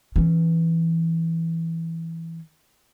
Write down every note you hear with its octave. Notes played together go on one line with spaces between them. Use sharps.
E3 C#4